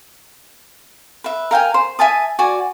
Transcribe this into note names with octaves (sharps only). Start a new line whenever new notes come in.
B4 E5
A#4 F5 G5 G#5
C5
E5 G#5 A5 D#6
F#4 D5 G#5